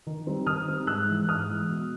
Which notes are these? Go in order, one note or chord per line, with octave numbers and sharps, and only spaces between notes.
D#3
G3 C4 D#4
D#3 D#6 F6
G3 C4 D#4
G#2 E6 F#6
E3 G#3
G#2 D#6 F6
E3 G#3
B2